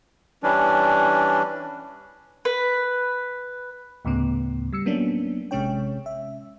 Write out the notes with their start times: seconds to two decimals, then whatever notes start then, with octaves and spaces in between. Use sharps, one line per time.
0.43 E3 G3 C#4 D4
2.45 B4
4.05 D2 A2 C#3 B3
4.73 G3 E6 C#7
4.86 F#3 A#3 B3 C#4 D4
5.51 A1 C3 G#3 C#4 C#5 G5
6.06 E5